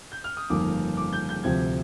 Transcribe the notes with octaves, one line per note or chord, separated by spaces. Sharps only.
G6
F6
D#6
G1 F2 D#3 A#3 D6
D6
G6
G6
D2 C3 F3 C4 G#6